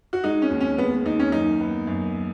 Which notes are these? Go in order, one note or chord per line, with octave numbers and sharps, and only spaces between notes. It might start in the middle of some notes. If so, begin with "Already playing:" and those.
F#4
G#3 D#4
C#4
D#2
C#4
G#3 B3
D#2 D#4
C#4
F#2 D#4
B3
F#2